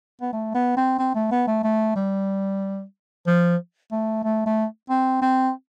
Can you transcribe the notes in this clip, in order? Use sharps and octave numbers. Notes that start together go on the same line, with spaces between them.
B3
A3
B3
C4
C4
A3
B3
A3
A3
G3
F3
A3
A3
A3
C4
C4